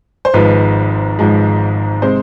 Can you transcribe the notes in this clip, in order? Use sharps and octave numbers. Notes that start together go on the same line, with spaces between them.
C5
G#1 G#2 F3 G#3 B4
G#1 G#2 F3 G#3
C3 G#3 C5